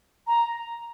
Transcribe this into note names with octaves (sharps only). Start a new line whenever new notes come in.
A#5